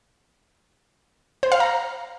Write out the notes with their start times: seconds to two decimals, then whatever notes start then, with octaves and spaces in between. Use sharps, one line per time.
1.43 C5
1.52 F5
1.60 A#5